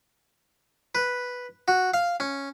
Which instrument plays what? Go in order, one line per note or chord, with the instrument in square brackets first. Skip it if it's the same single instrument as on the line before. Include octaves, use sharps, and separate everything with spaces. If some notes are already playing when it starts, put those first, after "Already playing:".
[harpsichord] B4
F#4
F5
C#4